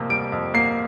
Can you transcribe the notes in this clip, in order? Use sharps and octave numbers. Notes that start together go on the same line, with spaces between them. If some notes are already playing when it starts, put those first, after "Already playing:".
Already playing: F2 C3 A#3
G3 D7
F2
A#3 C7